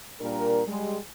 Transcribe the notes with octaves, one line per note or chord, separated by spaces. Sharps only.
A#2 G3 D4 A#4
G3 G#3